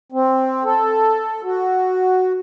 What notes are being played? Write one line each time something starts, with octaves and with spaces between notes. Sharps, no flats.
C4
A4
F#4